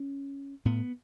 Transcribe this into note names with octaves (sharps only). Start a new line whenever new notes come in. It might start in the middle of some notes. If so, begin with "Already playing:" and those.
Already playing: C#4
A2 B3